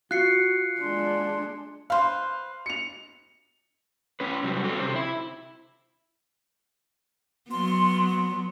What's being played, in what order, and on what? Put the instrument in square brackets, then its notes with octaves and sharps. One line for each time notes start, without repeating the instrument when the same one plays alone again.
[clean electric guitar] F4 [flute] F#4 [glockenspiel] F#6 C7 C#7
[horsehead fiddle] G#3 D4 [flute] C6
[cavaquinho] B4 C5 [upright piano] F5
[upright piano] C#7 F7
[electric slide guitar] C#4 B4
C3 F#3 G3
C#4 F#4 A4 C#5
C3 C5
E4 E5
[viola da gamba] F#3 B3 [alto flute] C6